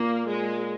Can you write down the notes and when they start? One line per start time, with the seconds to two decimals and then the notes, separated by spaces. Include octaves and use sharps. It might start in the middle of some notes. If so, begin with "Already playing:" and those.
Already playing: A#2 A#3
0.28 G#3